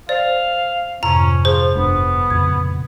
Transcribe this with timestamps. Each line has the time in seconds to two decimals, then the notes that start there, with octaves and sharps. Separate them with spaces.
0.09 C5 D5 F5
1.03 F2 G#2 C3 C#4 A#5
1.45 F3 G#4 C5
1.75 F1 G2 B3 D4
2.30 F2 A#2 C#3 G#6